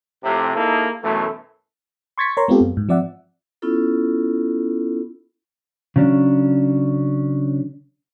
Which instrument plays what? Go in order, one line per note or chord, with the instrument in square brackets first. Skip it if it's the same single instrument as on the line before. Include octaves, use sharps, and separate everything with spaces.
[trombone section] F2 A2 C3
A#3 D#4 E4 G#4 A4
F#2 B2 E3 A3
[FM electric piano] C6 C#6 G#6 A6 B6 C#7
A#4 C#5 A#5 C6
G#3 B3 C4 F4 G4 A4
F#2
G#2
F3 C4 D5 E5 F#5
[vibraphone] B3 C#4 E4 F4 A4
[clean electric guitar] C#3 F#3 C#4 D4